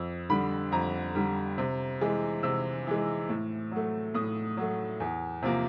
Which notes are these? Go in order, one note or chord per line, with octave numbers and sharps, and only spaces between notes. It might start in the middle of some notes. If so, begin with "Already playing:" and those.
Already playing: F2 E6
D3 G3 B5
F2 A#5
D3 G3
C3
E3 G#3
C3 E6
E3 G#3
A2
F#3 A3
A2 D#6
F#3 A3
E2
C3 F3 A#3